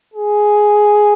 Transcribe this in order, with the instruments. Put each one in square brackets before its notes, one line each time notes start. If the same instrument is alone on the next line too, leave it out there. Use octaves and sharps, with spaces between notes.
[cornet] G#4